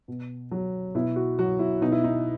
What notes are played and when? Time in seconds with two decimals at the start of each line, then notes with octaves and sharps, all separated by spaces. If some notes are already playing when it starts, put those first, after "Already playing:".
0.08 B2
0.51 F#3
0.95 B2 E4
1.16 F#4
1.39 F#3 F#4
1.59 E4
1.82 B2 D#4
1.92 E4
2.04 D#4